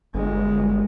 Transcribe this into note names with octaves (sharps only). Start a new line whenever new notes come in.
G1 G#3